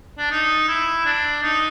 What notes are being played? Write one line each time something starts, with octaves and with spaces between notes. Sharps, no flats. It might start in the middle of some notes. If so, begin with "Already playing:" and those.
D4
D#4
E4
D4
D#4